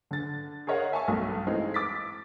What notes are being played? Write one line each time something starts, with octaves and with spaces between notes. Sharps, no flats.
D3 A6
G#4 A#4 C#5 D#5 F5 F#5
E5 G#5 A5 C#6
B1 G2 A3 D#6
E3 G#3 A3 C4 D#4 G#4
D6 A6 B6